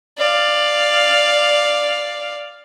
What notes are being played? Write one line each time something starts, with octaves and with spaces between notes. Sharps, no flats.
D5 F5